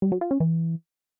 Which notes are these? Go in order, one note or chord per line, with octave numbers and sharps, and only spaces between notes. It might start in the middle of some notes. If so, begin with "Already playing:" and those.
G3
F#3
F4
C#4
E3